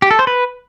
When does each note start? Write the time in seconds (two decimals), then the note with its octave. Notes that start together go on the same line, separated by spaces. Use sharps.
0.02 G4
0.11 A4
0.19 C5
0.27 B4